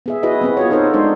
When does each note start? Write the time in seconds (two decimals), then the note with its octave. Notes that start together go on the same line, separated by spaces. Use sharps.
0.06 B3 G#4 E5
0.23 E4 F#4 G#4 B4 D#5
0.42 B3 C4 G#4
0.57 F4 F#4 C#5
0.70 D#4 A4 A#4 C5 C#5
0.94 G#3 D4 D#4 C5